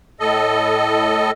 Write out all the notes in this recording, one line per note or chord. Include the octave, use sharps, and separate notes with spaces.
A2 A4 D#5